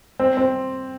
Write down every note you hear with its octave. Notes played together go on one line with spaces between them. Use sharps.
C4
C4